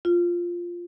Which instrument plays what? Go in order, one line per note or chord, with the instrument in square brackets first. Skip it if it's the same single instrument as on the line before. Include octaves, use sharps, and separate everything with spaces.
[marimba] F4